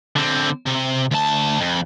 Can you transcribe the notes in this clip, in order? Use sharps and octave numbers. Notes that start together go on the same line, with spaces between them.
D3 C4
C3
D2 A5
F2